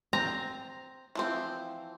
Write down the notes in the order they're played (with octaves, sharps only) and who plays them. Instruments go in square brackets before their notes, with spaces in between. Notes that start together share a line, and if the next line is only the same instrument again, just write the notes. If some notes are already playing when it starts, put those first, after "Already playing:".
[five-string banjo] C4 [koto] A#5
[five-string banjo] E3 F3 C4